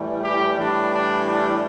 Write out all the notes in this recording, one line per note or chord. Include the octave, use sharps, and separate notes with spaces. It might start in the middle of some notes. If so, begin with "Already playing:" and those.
Already playing: A2 E3 G3
G4
A2 E3 G3 D4
D4
D4